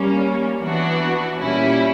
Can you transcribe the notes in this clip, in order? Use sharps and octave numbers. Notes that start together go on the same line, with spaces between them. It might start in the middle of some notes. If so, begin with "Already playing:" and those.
Already playing: G3 A#3 C#4
E3 B3 D4 F#4
A#2 G3 C#4 E4